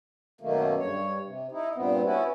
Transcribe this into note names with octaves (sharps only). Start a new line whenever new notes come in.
F#2 B2 D#3 A3 A#3
G2 C#5
C3
D#4 E4
G2 A#2 B3 C4
B3 C#4 E4 F#4